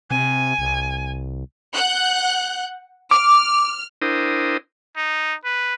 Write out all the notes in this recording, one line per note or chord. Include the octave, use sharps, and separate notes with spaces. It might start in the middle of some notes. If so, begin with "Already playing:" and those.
C3 G#5
C2
F#5 F#6 G6
D6 F6
D4 E4 A#4 C5 G5 D#6
D#4
B4